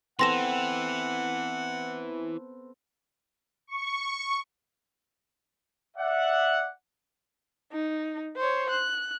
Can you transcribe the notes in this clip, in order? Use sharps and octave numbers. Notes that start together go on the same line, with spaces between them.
E3 B3 C4 A4 F#5 C6 A#6 E7
C#6
D5 E5 F#5
D#4
C5 C#5
F#6